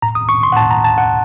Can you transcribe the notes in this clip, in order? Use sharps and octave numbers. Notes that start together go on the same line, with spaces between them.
A2 A#5
D#6
C#6
C6
F#5
A2 A5
A#5
A5
F#5